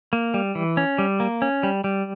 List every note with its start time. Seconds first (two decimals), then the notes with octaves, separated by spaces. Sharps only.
0.13 A#3
0.34 G3
0.55 E3
0.77 C#4
0.98 G3
1.20 A#3
1.42 C#4
1.63 G3
1.84 G3